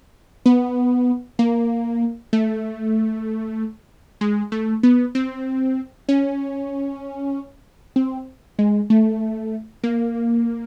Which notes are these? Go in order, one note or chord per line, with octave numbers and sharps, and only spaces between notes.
B3
A#3
A3
G#3
A3
B3
C4
C#4
C4
G#3
A3
A#3